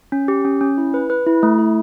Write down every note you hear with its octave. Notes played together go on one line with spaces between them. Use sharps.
C#4
G4
C#4
C#4
E4
B4
B4
E4
A3
E4